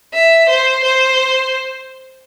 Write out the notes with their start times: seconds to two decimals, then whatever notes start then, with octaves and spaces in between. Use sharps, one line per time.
0.14 E5
0.49 C5
0.84 C5